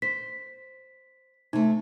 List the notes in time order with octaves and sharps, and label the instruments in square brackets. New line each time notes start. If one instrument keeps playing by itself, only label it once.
[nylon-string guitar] C5 [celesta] B6
[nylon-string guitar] C3 A3 [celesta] D#4